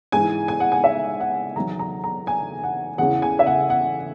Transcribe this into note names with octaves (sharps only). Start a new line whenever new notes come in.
G#2 E3 G#5
G#5
F#5
G#5
E5
F#5
E2 D#3 F#3 A#5
A#5
A#5
G#5
F#5
E2 C#3 E3 F#5
G#5
E5
F#5
F#5